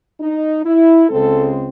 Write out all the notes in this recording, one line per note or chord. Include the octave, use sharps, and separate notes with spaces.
D#4
E4
C#2 C#3 G#3 C4 A4